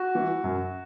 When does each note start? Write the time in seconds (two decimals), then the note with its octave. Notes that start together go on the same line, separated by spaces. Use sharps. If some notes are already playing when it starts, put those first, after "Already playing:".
Already playing: F#4
0.15 E3
0.44 F#2